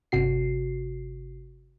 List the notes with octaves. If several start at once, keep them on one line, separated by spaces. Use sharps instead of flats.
G1 C3 F#4 C7